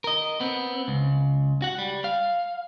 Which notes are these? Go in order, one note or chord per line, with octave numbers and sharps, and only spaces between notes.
A#4 D#5
B3 C4
C#2
F#4 F#5
G3
F5